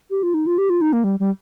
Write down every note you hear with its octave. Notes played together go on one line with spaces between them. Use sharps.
G4
F4
D#4
F4
G4
F4
D#4
A#3
G3
G3